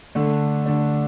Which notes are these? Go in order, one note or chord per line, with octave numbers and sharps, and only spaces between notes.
D3 A3 D4
D3 A3 D4